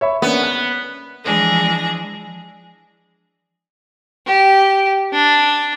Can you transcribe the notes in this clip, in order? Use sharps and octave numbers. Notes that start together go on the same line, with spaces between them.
C#5 E5 B5
A#3 B3 C#4 D4
F#6
E3 F3 G#3 D4 G#4 A#6
G4
D4